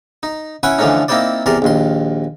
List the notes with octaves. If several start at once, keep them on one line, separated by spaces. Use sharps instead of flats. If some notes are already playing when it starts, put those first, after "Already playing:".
D#4
C#4 E4 B4 F#5 G#5
D3 E3 F3 A3 C#4 D#4
A#3 C4 D#4 E4 C5 D5
E2 C3 A#4 D5 C6
A#1 D#2 C6